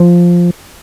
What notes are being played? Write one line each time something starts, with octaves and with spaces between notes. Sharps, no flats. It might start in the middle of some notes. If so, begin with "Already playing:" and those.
Already playing: F3